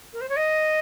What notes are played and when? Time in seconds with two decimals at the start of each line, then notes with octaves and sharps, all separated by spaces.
0.13 A#4
0.21 C5
0.29 C#5
0.37 D#5